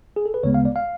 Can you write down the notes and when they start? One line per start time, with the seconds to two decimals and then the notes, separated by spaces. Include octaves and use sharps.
0.16 G#4
0.26 A4
0.34 B4
0.43 D2 C#3 G#3 B3 C#5
0.54 F5
0.65 D5
0.76 F5